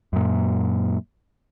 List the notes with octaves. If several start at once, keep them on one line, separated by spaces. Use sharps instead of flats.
F#2 A#2